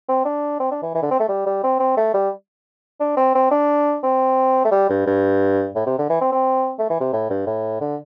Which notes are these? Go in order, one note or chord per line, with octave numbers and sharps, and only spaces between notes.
C4
D4
C4
D4
E3
E3
D3
C4
A3
G3
G3
C4
C4
A3
G3
D4
C4
C4
D4
C4
A3
G3
G2
G2
A2
C3
D3
E3
C4
C4
A3
E3
C3
A2
G2
A2
D3